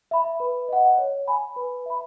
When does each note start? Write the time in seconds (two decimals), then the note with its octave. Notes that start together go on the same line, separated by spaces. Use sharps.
0.11 E5 B5
0.40 B4
0.69 D#5 F#5
0.98 C#5
1.28 G#5 B5
1.56 B4
1.86 E5 B5